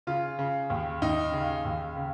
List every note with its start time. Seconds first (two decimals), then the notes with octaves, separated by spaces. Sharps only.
0.07 C#3 F4
0.39 C#3
0.70 D#2
1.02 D#2 D#4
1.33 C#3
1.65 D#2
1.97 C#3